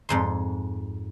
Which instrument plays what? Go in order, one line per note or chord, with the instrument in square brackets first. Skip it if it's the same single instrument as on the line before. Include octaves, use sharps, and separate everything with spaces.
[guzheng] F2 G#2 C6